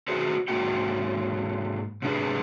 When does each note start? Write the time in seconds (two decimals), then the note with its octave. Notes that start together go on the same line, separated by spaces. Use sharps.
0.08 F#4 G#4 B4 C5 D5
0.48 G#2 A#3 F#4 G5
2.02 G#2 C3 D4 D#4 G#4 B4